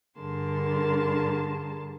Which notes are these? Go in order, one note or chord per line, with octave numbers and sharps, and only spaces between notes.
G2 D3 G#4 A#4 A5 C6